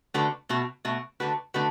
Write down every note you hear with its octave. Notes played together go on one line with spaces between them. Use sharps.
D3 A3 F#4 B4
B2 A3 F#4
B2 A3 F#4
D3 A3 F#4 B4
D3 A3 F#4 B4